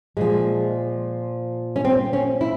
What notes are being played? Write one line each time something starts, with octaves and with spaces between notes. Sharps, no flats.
A#2 F3 G#3
C#4
C4
C#4
E4